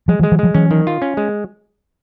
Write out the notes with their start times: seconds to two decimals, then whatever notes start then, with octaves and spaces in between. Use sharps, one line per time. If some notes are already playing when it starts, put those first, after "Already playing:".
0.08 F3 G3 G#3
0.19 E3 F#3
0.23 G#3
0.32 E3 F#3
0.39 F3 G3 G#3
0.54 E3 F#3 C#4
0.71 D#3
0.87 F4
1.02 C#4
1.17 G#3